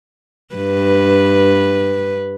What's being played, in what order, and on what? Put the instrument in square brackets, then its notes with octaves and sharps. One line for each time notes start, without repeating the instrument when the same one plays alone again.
[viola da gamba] G2 B4